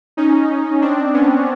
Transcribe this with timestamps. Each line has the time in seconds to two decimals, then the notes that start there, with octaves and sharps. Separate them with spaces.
0.17 C#4 D#4
0.81 C4 D4
1.14 B3 C#4